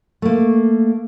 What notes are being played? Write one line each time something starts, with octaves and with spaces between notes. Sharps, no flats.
A3 A#3